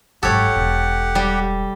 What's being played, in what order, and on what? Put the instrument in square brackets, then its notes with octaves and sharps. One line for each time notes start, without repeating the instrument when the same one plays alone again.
[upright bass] G#1 F#2 [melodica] G4 F#5 [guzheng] A4 C#5
[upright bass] E1
[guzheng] G3